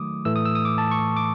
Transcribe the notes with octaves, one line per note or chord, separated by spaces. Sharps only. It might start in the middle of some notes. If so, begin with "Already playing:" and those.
Already playing: D#3 F#3 A3 D6 D#6
A2 E3 A3 E6
D#6
E6
D#6
D6
A5
C#6
D6